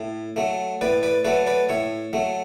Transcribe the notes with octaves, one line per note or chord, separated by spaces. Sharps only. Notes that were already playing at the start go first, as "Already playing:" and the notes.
Already playing: A2
F#3 A3
A2 B4 D5
B4 D5
F#3 A3 B4 D5
B4 D5
A2 C#5 E5
F#3 A3